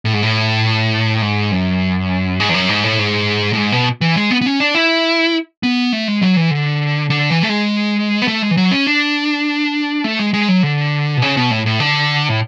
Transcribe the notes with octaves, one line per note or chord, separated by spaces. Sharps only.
A2
G#2
A2
G#2
F#2
G#2
E2
F#2
G#2
A2
G#2
A2
G#2
B2
E3
G#3
B3
B3
C#4
D4
E4
B3
A3
G#3
F#3
E3
D3
D3
E3
A3
G#3
B3
A3
G#3
E3
F#3
C#4
D4
A3
G#3
G#3
F#3
D3
B2
C#3
B2
A2
A2
D3
A2